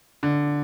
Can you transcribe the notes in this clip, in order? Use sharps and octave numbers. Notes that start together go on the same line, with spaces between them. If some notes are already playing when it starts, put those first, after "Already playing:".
D3